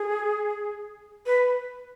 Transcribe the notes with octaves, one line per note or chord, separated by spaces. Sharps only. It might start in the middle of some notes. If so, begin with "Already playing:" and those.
Already playing: G#4
B4